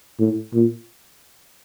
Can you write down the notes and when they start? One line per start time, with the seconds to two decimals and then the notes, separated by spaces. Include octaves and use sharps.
0.20 A2
0.54 A#2